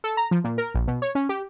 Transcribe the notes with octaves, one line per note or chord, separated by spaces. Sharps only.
A4
A#5
F3
A#2
A#4
A#1
B2
C#5
C#4
G4